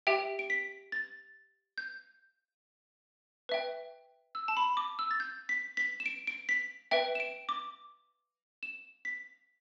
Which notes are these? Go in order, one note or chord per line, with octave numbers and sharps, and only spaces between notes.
G4 E5 G5 D7
D7
B6
A6
G6
B4 E5 G5
E6
A5
B5
D6
E6
A6
G6
B6
B6
E7
D7
D7
B6
B4 E5 G5 D7
E7
D7
D6
E7
B6